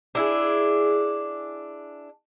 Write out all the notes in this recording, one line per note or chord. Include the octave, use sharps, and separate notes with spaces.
D4 E4 G#4